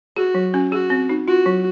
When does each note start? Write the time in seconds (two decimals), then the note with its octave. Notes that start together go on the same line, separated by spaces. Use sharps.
0.16 F#4 G#4
0.35 F#3
0.54 C#4
0.72 F#4 G#4
0.90 C4
1.09 D#4
1.28 F4 F#4
1.46 F#3